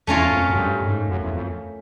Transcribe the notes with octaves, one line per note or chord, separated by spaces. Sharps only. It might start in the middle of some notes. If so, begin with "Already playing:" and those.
E2 A3 C#4 F4 A#4 C#5
F2
F#2
G2
G#2
F#2
E2
F2